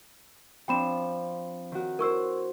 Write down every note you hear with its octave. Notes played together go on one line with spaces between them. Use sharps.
F3 C4 D4 G5 B5 E7
D#3 F#4
E4 A#4 C5 C#6 E6